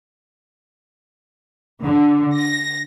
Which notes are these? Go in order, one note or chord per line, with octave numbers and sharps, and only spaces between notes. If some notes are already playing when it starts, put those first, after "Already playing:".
D3
A#6